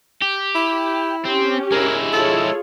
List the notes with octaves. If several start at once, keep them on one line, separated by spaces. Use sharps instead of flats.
G4
E4
C4 C#4 G4
G#3 E4 A#4
F4 G#4 A4 C#5